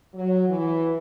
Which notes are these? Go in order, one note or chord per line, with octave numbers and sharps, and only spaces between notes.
F#3
E3